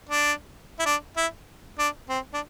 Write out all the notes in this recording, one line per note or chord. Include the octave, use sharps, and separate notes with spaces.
D4
E4
D4
E4
D4
C4
D4